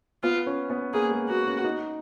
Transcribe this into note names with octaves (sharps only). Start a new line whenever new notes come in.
B3 F4
C#4
B3
A#3 G#4
G#3
A#3 F#4
C#4
D#4